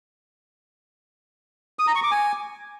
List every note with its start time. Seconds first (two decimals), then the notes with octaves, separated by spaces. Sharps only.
1.79 D#6
1.87 A#5
1.95 C#6
2.03 D6
2.11 G#5